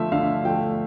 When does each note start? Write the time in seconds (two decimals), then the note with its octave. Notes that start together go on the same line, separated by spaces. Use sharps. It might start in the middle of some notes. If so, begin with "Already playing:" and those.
Already playing: D3 F3 A3 E5
0.12 D3 F5
0.45 F3 A3 G5